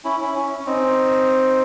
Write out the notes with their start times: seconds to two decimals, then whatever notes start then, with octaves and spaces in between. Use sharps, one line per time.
0.05 C#4 E4
0.20 C#4 E4
0.36 C#4
0.59 C#4
0.66 C4 D#4